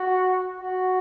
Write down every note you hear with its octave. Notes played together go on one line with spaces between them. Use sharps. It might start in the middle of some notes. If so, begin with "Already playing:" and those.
Already playing: F#4
F#4